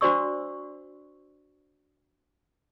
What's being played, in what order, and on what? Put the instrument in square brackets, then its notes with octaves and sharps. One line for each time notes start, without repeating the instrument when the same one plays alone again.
[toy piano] D4 F#4 C5 D5 C#6 E6